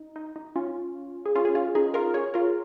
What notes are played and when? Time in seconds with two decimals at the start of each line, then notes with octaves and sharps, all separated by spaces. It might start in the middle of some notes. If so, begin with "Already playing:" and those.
Already playing: D#4
0.16 D#4
0.36 D#4
0.56 C#4 F4
1.26 G#4
1.35 C#4 F4
1.45 G#4
1.55 C#4 F4
1.75 D#4 G#4
1.94 F4 A#4
2.14 G#4 C#5
2.34 F4 A#4